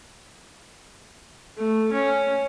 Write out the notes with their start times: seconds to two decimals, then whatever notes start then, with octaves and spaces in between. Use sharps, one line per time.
1.57 A3
1.92 C#4